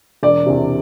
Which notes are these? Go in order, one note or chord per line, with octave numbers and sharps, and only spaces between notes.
E1 D5
E2 C3